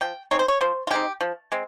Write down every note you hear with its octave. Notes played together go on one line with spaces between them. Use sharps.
F3 G5
G#3 C4 D#4 C#5
C5
C#5
F3 C5
F4
G#3 C4 D#4 G4
F3
G#3 C4